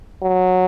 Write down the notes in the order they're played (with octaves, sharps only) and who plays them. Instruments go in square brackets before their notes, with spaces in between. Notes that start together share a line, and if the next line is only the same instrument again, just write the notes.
[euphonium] F#3